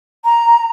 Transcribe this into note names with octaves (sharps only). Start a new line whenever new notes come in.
A#5